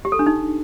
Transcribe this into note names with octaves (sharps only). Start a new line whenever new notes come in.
G4
A4
D4
D#4